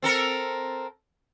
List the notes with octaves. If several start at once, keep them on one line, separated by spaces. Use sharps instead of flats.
C4 A4 A#4